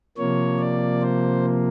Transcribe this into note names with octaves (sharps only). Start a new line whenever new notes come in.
C3 F3 A#3 C#5
D5
C5